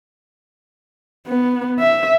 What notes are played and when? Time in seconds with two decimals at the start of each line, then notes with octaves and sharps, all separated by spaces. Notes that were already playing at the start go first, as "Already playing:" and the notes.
1.27 B3
1.79 E5